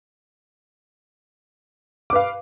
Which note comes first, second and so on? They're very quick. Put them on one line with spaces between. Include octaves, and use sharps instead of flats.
D6 B4 F5